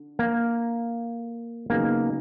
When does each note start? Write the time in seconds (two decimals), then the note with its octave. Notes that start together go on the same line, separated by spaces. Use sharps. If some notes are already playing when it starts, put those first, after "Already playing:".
Already playing: D3
0.19 A#3
1.70 C#3 F#3 A#3 B3 D#4 G#4